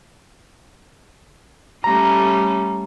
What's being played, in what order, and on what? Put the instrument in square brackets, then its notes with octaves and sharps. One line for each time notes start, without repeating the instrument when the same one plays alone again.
[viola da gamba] G3 A3 C#4 [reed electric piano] A#5